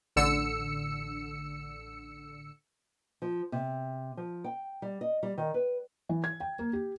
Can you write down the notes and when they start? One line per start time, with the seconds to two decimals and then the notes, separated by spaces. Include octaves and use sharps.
0.16 A1 D3 E6 C#7
3.22 F3
3.52 C3
4.17 F3
4.44 G5
4.82 G3
5.01 D#5
5.23 G3
5.38 D#3
5.54 B4
6.09 E3
6.24 G#6
6.40 G5
6.59 A#3
6.73 G4